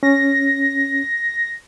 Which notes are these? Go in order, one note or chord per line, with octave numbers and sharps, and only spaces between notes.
C#4 A#6